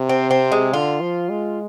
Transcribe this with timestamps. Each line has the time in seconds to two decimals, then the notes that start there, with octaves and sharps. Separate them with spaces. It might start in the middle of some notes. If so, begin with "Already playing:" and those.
Already playing: C3
0.09 C4
0.31 C4
0.52 G#3
0.73 D3 F4
1.01 F3
1.30 G#3